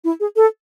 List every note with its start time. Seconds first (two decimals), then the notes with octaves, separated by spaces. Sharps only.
0.04 E4
0.20 G#4
0.36 A4